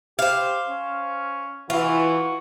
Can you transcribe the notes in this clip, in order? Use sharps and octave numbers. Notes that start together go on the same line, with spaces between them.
G4 C5 F5
C#4
E3 F4 F#4